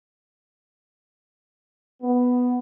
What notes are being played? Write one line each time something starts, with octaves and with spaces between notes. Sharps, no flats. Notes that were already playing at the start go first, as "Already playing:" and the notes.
B3